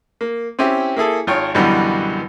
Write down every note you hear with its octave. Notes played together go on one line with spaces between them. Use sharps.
A#3
C4 C#4 E4 G4
A#3 E4 G#4 A4
G#1 F4 C#5 G5 F6
F#2 B2 D3 E3 G3